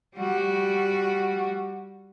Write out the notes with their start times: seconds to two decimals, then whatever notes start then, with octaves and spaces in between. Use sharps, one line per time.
0.16 G3 F#4